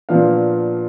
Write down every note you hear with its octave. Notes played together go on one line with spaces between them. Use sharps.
A#2 F3 B3 D4 F5